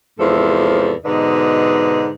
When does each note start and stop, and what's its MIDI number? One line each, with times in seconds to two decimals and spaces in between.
0.19 0.92 40
0.19 0.92 44
0.19 0.92 48
0.19 0.92 53
0.19 0.92 69
1.05 2.09 44
1.05 2.09 47
1.05 2.09 50
1.05 2.09 63
1.05 2.09 71
1.05 2.09 75